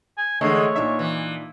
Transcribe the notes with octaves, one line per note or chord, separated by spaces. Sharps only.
G#5
D3 E3 G#3 A3 C#5
A#2 D4 D#4 E5
E3